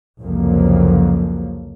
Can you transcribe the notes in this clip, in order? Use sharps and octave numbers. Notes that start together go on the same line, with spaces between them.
C2 F2 C#3 F3 F#3 A#3